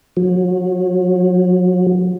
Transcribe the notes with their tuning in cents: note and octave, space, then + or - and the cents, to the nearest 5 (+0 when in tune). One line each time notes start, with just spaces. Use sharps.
F#3 -35